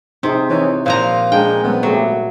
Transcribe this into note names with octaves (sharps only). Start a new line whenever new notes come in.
C3 C4 D#4 G#4
E3 C4 D#4 C#5
A#2 F3 C5 F5 A#5
G#3 D4 A#4 G5
G3 G#3 B3 C4
F#3 G#3 A3 G4